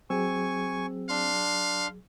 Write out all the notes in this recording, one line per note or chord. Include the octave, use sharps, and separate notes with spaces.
F#3 C4 G#4 G#5 C#6 E6
D4 F5 C6